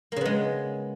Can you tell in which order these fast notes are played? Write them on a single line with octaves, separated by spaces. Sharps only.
A#3 C#3 B3 G#3